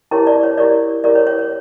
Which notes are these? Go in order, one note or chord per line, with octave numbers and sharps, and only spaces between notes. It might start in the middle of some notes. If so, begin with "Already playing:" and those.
E4 G4 A#4 C#5 A5
D5
C#5
E4 G4 A#4 C#5 D5
E4 G4 A#4 C#5 D5
C#5
C#5
C#5